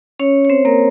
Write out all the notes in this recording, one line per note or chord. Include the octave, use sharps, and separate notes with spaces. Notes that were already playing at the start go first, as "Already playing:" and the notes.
C#4 C#5
C#5
C4 C5
A#3 A#4